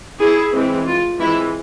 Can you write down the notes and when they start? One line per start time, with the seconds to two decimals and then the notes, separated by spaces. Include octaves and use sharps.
0.19 E4 G#4
0.52 E3 G#3 C4
0.86 F4
1.19 E3 G#3 C4 E4